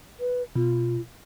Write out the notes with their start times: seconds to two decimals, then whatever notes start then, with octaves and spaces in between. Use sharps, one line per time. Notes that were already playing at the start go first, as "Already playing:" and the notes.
0.20 B4
0.56 B2 F4